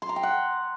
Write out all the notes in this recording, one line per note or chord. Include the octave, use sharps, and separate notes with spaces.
C6
A#5
G5
F#5